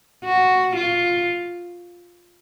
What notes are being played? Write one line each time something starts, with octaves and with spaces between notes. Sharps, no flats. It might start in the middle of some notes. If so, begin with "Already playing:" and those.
F#4
F4